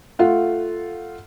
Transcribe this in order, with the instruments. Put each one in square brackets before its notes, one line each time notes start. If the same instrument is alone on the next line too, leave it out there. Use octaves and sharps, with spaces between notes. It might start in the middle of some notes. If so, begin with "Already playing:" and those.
[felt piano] A3 F4 F#5